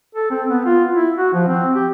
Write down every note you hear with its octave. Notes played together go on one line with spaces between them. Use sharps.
A4
C4
B3
F4
E4
F#4
F3
C4
G4